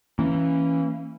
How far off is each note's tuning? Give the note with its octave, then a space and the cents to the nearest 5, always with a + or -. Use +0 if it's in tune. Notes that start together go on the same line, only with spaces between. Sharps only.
E3 -5 A#3 -15 C#4 -10